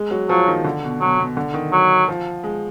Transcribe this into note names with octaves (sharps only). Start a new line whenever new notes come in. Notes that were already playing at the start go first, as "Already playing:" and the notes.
Already playing: G#3
F#3
F3 F#3
D#3
D3
B2
B2 F#3
B2
D3
D#3
F#3
F3
G#3